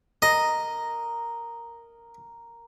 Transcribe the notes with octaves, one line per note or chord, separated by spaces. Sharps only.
A#4 D#5